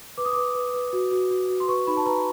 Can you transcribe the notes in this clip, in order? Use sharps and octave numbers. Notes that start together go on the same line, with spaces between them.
B4 D6
D#6
B4 D6
B4
B4
F#4
F#4
F#4
F#4
C6
B4 C#6
D#4 B5
A5
B4 A#5